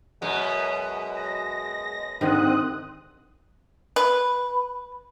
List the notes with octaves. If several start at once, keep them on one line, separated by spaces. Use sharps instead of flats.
F#2 B2 G#3 B3
A#6
C2 G#2 D3 D#3 C4 D#6 F#6
B4